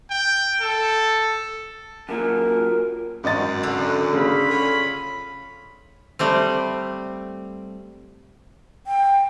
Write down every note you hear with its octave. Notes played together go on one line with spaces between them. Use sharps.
G5
A4
F#2 A#2 F#3 A#4
G#1 F#2 D#5 A6
D3
C#3 F4 B5
C#4
G3 A3 C4
G5